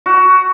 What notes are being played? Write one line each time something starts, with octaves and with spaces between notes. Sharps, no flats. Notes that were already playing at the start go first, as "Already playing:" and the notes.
F#4